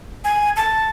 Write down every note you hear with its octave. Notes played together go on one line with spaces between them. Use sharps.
G#5
A5